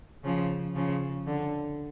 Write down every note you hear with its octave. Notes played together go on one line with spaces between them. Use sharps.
C#3 F3
C#3 F3
D3